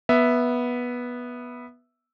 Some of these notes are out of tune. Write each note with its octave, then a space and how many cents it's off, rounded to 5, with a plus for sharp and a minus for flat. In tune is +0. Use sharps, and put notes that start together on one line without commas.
B3 -10 E5 +0